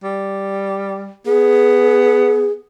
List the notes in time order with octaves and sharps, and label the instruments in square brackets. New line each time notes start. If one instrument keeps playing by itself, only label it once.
[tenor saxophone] G3
[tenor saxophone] B3 [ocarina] G#4